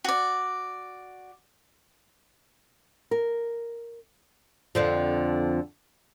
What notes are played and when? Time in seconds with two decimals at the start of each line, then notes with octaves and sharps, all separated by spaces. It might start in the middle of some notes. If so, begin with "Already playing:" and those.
0.04 F#4 D5
3.11 A#4
4.75 F2 D3 F3